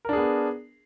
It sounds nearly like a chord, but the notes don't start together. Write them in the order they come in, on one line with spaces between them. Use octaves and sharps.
A#4 D4 G#4 B3